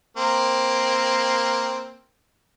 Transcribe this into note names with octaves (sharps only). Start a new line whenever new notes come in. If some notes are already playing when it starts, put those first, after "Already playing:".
A#3 C4